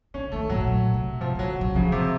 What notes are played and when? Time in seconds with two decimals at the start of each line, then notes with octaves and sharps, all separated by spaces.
0.14 C#3 C#4
0.32 D#3 A3
0.49 A2 F#3
0.61 A2
0.67 A#2
0.94 C3
1.21 C3 F3
1.35 C#3 F#3
1.61 C#3
1.75 C#3 F3
1.92 C3